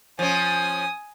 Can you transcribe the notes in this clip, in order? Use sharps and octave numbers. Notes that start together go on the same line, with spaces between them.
F3 C#4 G#5 D#6